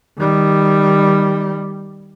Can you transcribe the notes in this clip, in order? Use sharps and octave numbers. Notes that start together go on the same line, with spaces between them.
D#3 G3